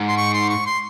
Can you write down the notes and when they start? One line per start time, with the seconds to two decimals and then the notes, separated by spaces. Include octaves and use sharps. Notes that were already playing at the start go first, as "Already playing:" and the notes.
Already playing: G#2
0.08 C6
0.17 C#6
0.33 C6
0.50 C#6
0.66 C6